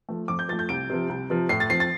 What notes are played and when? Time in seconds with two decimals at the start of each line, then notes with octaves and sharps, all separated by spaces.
0.09 F3 A3
0.28 F2 D6
0.39 G6
0.49 F3 A3 A6
0.59 G6
0.69 C2 D7
0.90 C3 F3
1.09 C2
1.30 C3 F3
1.49 A2 C7
1.60 A6
1.70 F3 C4 C7
1.80 A6